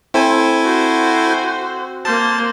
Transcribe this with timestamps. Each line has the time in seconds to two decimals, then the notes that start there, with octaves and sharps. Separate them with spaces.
0.14 C4 E4 A4 G#5
0.63 F#4 C5
2.05 A#3 C5 A5